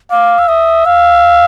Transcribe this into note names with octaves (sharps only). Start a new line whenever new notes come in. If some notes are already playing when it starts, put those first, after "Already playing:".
F5 D6
E6
E5 D#6
F5 E6